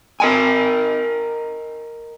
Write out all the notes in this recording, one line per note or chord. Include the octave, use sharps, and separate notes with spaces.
A#4 D#5 G#5